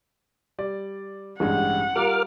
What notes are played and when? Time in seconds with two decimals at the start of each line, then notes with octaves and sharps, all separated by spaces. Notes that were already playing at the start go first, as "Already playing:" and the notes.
0.58 G3 D5
1.40 A1 G2 G#3 F#5
1.96 G3 F4 A#4 D6 F6